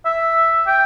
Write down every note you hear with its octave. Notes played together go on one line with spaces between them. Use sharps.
E5
G5